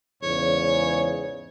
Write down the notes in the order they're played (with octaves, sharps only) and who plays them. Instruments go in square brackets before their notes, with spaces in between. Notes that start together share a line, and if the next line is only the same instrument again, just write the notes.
[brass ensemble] E2 G#2 C#3 [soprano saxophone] C#5